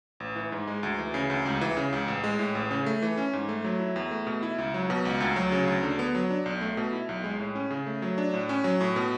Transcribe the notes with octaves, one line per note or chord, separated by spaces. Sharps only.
A1
E3
G#2
G#3
D2
E3
C#3
D2
C#2
E3
C#3
C#2
A1
G#3
A2
A1
C#3
A3
E3
C#4
G#2
A3
F#3
E4
E2
A3
B2
E4
C#2
F#3
B2
C#2
D2
F#3
C#3
D2
D3
B3
F#3
D4
B1
A3
B2
E4
B1
G#3
A2
C#4
C#3
A3
F#3
D4
A2
C#4
F#3
A2
B2